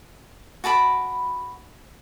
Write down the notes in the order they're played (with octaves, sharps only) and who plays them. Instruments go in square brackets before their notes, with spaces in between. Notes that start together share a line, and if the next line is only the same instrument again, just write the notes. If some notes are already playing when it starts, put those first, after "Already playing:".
[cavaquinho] F#4 A5 B5 D6